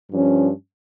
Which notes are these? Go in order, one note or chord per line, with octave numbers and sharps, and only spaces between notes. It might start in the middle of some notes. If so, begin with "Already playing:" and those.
G2 F3 C#4